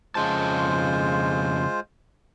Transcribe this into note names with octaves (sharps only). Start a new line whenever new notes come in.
F2 C#3 G#3 F4 C5 A5